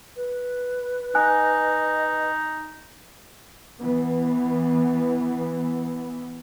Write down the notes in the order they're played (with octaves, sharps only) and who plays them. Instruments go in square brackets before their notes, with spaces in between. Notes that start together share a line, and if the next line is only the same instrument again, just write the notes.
[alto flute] B4
[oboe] D#4 [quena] D#5 [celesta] G#5 F#6
[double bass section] E3 B3